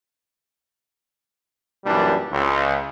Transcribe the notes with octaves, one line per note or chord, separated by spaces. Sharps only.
F#2 A#2 E3 G3 D4
C#2